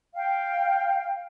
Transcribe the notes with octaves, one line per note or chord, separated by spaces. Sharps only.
F5 G5